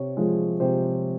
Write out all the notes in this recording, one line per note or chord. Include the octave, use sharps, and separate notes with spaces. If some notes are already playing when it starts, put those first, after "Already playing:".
Already playing: C3 C#5
F3 G#3
C3 C5